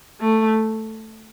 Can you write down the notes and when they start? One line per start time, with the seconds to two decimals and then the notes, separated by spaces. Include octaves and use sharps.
0.20 A3